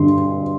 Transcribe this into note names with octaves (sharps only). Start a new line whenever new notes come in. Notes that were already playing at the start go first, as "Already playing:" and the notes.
Already playing: G2 D3 C6